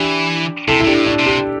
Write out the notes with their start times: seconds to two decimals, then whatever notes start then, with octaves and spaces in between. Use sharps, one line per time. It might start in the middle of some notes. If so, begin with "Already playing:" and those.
Already playing: E3 D4 G4
0.68 C3 E4 A4
0.80 E4
0.84 C3 D4 G4
0.94 A2
1.07 D4
1.19 C3
1.26 D4 G4